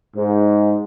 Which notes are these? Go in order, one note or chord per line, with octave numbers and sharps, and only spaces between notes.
G#2